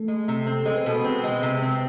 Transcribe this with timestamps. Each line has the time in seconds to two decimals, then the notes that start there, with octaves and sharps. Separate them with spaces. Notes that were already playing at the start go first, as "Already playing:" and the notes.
Already playing: A3 A4
0.08 G#3
0.28 C3
0.47 C4
0.66 G#3 C5
0.76 B4
0.85 B2 A4
0.94 B3 B4
1.04 C4
1.24 G#3
1.43 C3
1.62 C4